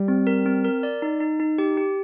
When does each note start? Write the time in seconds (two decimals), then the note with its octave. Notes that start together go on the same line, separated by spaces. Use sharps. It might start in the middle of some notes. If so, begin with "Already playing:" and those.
Already playing: G3
0.08 C4
0.27 A#4
0.46 C4
0.65 A#4
0.83 D5
1.02 D#4
1.20 D#4
1.40 D#4
1.58 G4
1.77 G4